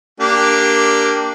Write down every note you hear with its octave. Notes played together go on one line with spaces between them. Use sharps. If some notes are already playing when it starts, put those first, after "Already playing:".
A#3 D4 G4